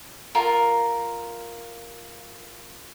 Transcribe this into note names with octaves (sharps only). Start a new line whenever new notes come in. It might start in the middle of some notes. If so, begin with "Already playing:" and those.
F4 A#4